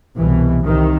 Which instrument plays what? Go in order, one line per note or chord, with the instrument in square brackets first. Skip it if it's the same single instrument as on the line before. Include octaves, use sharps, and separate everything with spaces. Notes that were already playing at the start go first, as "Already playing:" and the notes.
[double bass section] C2 B2 E3
C2 C3 D#3